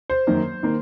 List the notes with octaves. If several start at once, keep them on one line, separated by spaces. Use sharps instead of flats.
C5
F#2 D#3 A#3
D#3 A#3